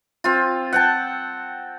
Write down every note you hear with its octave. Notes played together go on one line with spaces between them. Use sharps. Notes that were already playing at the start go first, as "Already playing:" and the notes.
C4 F4
F#5 G5 A5